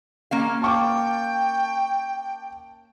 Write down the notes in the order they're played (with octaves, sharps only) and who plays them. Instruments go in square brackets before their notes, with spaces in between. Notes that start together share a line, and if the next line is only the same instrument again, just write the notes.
[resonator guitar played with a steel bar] A#3 C#4 F5
[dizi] G5 [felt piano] A5 C#6 D6